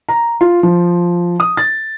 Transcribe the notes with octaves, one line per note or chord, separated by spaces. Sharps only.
A#5
F4
F3
D#6
A6